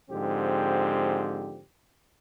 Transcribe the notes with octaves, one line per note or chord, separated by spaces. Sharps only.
G#2 D3 F3 C4 G4